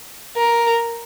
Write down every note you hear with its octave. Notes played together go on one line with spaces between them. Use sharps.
A#4